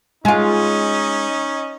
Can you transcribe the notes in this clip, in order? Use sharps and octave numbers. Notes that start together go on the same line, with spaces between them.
G#3 C#4 D#4 F4 D#5